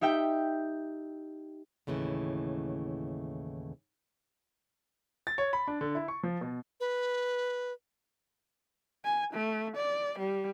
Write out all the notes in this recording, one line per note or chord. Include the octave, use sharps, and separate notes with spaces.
D#4 G4 E5 G5
D#2 A2 C#3 E3
A6
C#5
B5
D4
D3
E4
C#6
F3
B2
B4
G#5
A3
D5
G3